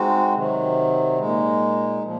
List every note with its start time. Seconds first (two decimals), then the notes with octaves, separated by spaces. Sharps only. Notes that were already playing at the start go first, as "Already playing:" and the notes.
Already playing: G#3 C4 D#4 F#4
0.34 C3 D#3 F#3
1.18 A#2 G#3 D#4
2.03 A#2 F3